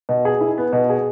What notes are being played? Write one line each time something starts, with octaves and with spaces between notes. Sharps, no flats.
B2
G#4
E4
B3
B2
G#4